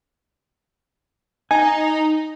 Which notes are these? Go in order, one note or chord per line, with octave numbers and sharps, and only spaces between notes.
D#4 G#5